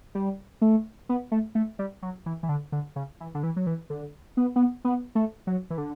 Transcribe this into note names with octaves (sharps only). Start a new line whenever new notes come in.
G3
A3
B3
A3
A3
G3
F#3
E3
E3
D3
D3
C#3
E3
D3
E3
F#3
E3
D3
B3
B3
B3
A3
F#3
E3
D3